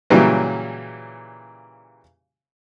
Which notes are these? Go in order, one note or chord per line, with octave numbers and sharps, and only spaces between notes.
A#2 C#3 E3 F#3 G3